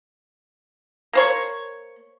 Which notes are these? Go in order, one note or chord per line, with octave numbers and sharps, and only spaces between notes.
A#3 C5 C#5